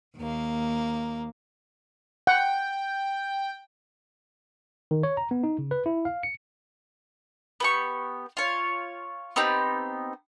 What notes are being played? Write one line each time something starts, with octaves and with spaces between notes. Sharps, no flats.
D#2 A#3
F#5 G5
D#3
C#5
A#5
B3
D#4
C#3
B4
E4
F5
C#7
B3 G4 C#6
F4 C#5
B3 C4 D#4 G4